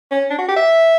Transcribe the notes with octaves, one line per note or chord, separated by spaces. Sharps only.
C#4
D4
F#4
G4
E5